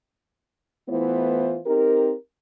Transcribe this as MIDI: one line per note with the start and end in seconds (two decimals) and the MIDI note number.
0.89 1.59 52
0.89 1.59 57
0.89 1.59 59
0.89 1.59 64
0.89 1.59 65
0.89 1.59 72
1.66 2.14 60
1.66 2.14 63
1.66 2.14 67
1.66 2.14 70